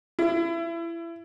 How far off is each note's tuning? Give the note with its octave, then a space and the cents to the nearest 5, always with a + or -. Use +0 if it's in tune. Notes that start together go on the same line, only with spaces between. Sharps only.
E4 +30